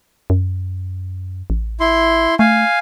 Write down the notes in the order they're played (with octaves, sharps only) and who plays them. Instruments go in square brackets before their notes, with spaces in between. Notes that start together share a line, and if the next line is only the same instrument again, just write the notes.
[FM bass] F#2
A1
[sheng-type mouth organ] E4 C6
[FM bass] A3 [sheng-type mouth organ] F5 G#5